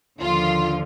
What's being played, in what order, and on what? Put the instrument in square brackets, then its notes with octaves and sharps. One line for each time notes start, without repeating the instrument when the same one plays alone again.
[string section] D#2 D3 F3 F4